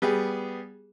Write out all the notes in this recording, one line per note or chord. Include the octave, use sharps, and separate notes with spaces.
G3 B3 G#4